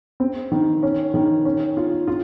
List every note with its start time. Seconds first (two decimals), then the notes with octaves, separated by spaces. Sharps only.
0.20 C4
0.52 D#3
0.83 C#4
1.14 D#3
1.45 C#4
1.77 F4
2.08 F4